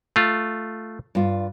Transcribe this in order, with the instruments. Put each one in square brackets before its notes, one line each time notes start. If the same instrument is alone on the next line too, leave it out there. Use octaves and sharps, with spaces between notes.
[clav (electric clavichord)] A3 F4
[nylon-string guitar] G2 F4